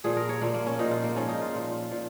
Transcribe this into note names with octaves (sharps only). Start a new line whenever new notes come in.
A#2 F3 G#4
A#4
C#5
A#2 F3 A#3
A#3
C#4
A#2 F3 D#4
F4
A#3
G#2 F3 C#4
D#4
F4
A#2 F3
A#2 F3